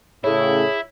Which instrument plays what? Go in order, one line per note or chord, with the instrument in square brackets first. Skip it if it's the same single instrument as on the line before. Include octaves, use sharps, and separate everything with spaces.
[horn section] A2 C#3 [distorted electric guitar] E4 [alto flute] G#4 [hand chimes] C#5